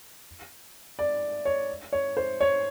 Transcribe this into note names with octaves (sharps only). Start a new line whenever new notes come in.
D5
C#5
C#5
C5
C#5